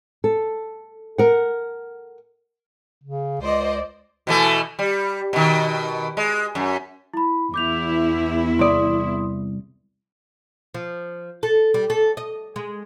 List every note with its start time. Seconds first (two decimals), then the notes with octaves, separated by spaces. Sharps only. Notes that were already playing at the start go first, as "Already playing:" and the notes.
0.24 A4
1.18 A#4 F#5
3.04 C#3
3.41 C#2 C5 D5 D#5
4.27 B2 E3 A3
4.79 G3
5.33 B2 D#3
6.17 G#3
6.55 F#2
7.14 E4 B5
7.54 E2 E4 D6 G6 F7
8.59 C2 D5 C6 D#6
10.74 F3
11.43 A4
11.74 G3
11.90 A4
12.17 D#5
12.56 G#3